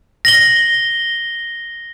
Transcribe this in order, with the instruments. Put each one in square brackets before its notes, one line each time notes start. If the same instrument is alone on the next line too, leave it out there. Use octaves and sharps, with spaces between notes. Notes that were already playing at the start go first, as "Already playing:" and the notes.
[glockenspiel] A#6 F#7 G7